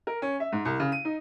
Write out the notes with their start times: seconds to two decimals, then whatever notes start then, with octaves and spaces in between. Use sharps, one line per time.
0.07 A#4
0.22 C#4
0.40 E5
0.52 G#2
0.65 C2
0.80 C#3
0.92 D#7
1.05 D#4